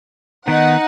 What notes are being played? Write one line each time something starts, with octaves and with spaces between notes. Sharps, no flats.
D#3 B3 D#4 F#5